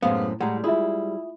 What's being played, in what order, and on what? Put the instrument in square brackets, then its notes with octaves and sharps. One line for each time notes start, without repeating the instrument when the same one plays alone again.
[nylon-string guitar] F#2 A2 C5 [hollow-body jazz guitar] C3 G#3 B3 [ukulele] F5
[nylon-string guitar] A2 [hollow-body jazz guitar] G3 G#3 [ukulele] F#5 A#5
[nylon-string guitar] E4 [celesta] F4 E5 [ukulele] G#4